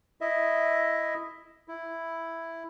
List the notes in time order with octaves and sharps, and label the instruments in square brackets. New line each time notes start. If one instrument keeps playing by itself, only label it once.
[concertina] E4 D#5 E5
E4